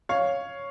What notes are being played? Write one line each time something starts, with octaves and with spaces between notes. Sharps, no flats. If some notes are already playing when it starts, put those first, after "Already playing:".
C#5 F5